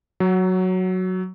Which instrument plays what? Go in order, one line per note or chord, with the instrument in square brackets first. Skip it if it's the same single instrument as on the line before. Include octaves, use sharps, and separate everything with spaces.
[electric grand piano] F#3